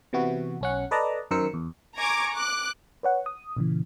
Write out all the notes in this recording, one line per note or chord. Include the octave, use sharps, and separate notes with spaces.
C3 E3 B3 E4 F#4
B1 C#4 F#5
A4 B4 D5 D#5 A5 A#5
F#2 D#3 A#4 C5 E6 C#7
E2
G#5 A#5 C#6 D6 G#6 D7
D6 F#6
B4 C#5 F#5
D#6
A#2 C#3 E3